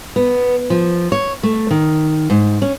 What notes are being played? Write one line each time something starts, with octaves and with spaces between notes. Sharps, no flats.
B3
F3
C#5
A3
D#3
G#2
C#4